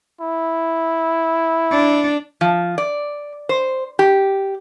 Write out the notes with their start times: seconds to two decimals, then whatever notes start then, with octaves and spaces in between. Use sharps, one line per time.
0.21 E4
1.71 D4
2.41 F3
2.78 D5
3.49 C5
3.99 G4